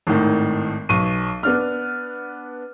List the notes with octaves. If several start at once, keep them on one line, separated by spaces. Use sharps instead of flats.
G#1 A2 D#3
B1 C#6 D#7
B3 D4 F6